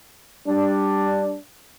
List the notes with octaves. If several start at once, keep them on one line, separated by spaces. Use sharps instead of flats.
G3 D4